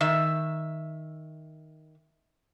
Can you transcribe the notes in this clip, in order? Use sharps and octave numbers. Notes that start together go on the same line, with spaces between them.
D#3 E5